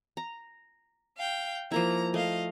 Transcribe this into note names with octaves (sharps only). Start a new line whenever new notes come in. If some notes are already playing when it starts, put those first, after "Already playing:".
A#5
F5 G5
F3 A#3 E4 A#5
A3 D#5 F5